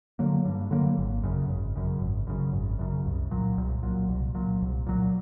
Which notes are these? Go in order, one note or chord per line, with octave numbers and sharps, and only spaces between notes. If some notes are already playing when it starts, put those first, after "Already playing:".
D3 F#3 A#3
G2
D3 F#3 A#3
G#1
F#2 C#3
G#1
F#2 C#3
G#1
F#2 C#3
G#1
F#2 C#3
C2
A#2 F#3
C2
A#2 F#3
C2
A#2 F#3
C2
A#2 F#3